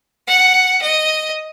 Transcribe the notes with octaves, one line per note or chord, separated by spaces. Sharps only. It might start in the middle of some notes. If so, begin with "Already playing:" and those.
F#5
D#5